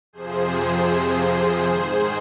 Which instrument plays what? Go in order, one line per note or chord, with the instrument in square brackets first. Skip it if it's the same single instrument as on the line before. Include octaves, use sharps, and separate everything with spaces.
[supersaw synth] F2 C3 F3 G#4 C5
G#2 D#3